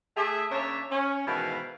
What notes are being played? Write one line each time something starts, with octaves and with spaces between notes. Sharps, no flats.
A3 G#4 E5
C#3 A#3 D4 C#5 E5 A5
C#4
G#2 B2 D#3 E3 B4 F5